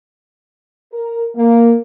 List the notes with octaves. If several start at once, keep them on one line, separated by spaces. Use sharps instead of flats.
A#4
A#3